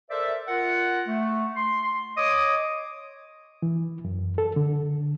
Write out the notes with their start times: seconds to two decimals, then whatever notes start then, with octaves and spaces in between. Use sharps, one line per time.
0.11 A4 A#4 C5 D5 E5
0.48 F4 A#4 F#5
1.08 A3
1.56 C6
2.17 C#5 D#5 D6 D#6
3.62 E3
4.05 F#2
4.38 A4
4.56 D3